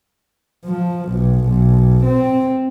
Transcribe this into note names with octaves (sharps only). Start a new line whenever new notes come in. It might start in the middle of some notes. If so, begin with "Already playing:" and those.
F3
B1
B1
C4